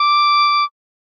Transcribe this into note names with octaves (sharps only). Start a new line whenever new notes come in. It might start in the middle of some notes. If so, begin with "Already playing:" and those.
Already playing: D6